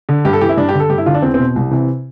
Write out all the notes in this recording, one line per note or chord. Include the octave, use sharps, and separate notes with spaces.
D3
G2 G4
A4
E3 G4
E4
G2 D4
G4
D3
A4
G2 G4
E4
D3 F4
D4
E2 C4
B2 C4
C2
C3 E3